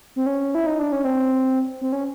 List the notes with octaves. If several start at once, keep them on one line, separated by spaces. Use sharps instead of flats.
C4
C#4
E4
D#4
D4
C#4
C4
C4
C#4